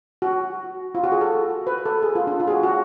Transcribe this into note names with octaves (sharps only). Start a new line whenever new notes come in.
F#4
F4
F#4
G#4
A4
B4
A4
G#4
F4
D4
F4
G#4
F#4
F#4